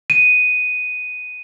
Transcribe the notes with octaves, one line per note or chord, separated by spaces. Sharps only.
D#7